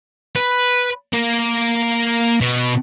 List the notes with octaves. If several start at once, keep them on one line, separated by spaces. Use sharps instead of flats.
B4
A#3
B2